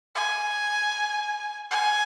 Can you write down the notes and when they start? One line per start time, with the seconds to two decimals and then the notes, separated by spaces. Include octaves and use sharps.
0.15 G#5
1.71 G#5